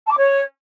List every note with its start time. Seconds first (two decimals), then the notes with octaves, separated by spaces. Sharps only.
0.06 A5
0.12 D6
0.18 C#5